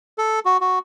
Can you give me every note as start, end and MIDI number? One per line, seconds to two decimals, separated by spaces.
0.18 0.39 69
0.45 0.57 66
0.61 0.79 66